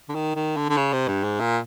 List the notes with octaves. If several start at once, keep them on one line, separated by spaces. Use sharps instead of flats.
D3
D#3
D#3
D3
D3
C#3
C3
G2
G#2
A#2